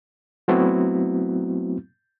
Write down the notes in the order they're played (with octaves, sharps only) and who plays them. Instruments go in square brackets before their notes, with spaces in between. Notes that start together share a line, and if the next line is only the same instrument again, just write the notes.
[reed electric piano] F#3 A3 B3 C4 E4 F#4